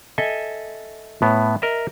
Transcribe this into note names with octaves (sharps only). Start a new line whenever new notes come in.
A4 D#5 E5 G#5
A2 B3
A#4 D#5 E5